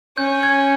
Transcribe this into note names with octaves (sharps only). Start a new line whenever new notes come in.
C#4 G6
G#6